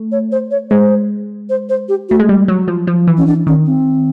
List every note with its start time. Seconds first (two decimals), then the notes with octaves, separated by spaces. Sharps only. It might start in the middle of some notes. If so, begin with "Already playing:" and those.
Already playing: A3
0.12 C#5
0.32 C5
0.51 C#5
0.71 G#3 C5
1.50 C5
1.69 C5
1.89 G4
2.09 A3 F#4
2.19 G#3
2.29 G3
2.48 F#3
2.68 F3
2.87 F3
3.07 E3
3.18 C#4
3.27 D4
3.47 D#3 C#4
3.66 C4